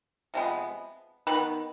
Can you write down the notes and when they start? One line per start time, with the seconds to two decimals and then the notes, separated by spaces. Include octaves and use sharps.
0.34 C3 F3 G#3 B3
1.27 D#3 B3 B4